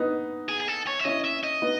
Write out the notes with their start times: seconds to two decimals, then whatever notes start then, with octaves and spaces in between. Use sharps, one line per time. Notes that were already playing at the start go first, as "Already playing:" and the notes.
Already playing: B3 D#4
0.49 G#4
0.60 G#4
0.68 A4
0.87 C#5
1.00 E5
1.05 C#4 E4 D#5
1.24 E5
1.43 D#5
1.62 B3 D#4